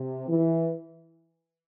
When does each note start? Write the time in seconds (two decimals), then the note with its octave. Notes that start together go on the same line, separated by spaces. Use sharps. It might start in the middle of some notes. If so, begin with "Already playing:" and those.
Already playing: C3
0.28 E3